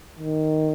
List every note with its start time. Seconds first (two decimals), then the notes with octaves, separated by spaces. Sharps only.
0.19 D#3